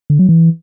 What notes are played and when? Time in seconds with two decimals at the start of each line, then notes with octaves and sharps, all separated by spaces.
0.10 D3
0.19 F#3
0.29 E3